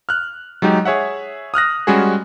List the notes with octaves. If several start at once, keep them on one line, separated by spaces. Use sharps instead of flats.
F6 F#6
F#3 G#3 D#4 G4
G#4 C#5 E5 F#5
D#6 F6 F#6 A#6
G3 G#3 C#4 F#4 G#4